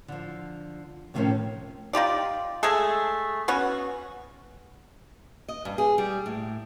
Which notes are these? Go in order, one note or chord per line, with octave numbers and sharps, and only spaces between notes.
D3 F3
A2 C3 D#3 F3 A3 C#4
D#4 F4 G4 D5
G#3 A3 G#4 A4
B3 C#4 F#4
D#5
G2
G#4
G3
A2